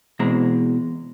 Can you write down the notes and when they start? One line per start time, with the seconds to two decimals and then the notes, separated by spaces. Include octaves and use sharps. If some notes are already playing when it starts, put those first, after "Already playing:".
0.19 B2 E3 G#3 C4 A#5